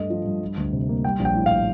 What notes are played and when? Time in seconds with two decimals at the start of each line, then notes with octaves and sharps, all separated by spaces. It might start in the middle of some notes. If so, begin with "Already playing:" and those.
Already playing: G2 A3 D#5
0.10 F3
0.25 G2
0.41 G3
0.57 D2
0.73 C3
0.89 A#3
1.05 G3 G5
1.19 A#1
1.25 G5
1.35 A2
1.46 F5